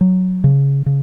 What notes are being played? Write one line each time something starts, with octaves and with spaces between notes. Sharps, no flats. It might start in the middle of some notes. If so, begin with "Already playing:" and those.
F#3
C#3
C#3